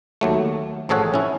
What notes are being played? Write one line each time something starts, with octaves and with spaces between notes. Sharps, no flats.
D#2 F#3 A3
A1 F3 G#4 A4 C#5 F#5
C#4 E4